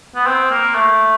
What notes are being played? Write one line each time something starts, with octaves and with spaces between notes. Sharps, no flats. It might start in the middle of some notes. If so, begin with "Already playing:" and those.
B3
C4
A#3
A3